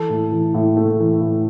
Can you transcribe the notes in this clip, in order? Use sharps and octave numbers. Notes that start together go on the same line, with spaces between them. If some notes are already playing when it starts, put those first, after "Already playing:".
Already playing: E3 A4
A2
E3
A2
A3
E3
A2